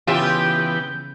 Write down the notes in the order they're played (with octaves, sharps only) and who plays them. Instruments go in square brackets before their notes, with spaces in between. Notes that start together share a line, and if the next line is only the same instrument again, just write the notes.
[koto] C#3 E5 [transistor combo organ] E3 B3 [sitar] F4 G4 [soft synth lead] G6